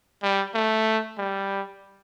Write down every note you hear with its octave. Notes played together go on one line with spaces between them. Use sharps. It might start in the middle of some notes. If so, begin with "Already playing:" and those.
G3
A3
G3